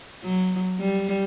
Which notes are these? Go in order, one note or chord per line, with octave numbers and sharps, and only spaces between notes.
F#3
G3